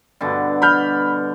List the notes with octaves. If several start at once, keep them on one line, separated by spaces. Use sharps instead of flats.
G2 B2 D3
B5 F6 G6